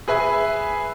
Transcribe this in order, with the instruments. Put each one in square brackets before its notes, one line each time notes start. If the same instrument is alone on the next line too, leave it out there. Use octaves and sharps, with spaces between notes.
[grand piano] G#4 B4 E5 G#5